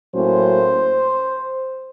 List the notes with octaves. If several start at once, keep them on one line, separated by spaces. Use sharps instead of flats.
A2 F#3 A#3 C#4 C5